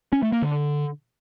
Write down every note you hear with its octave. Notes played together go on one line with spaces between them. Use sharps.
C#4
A3
A#3
D3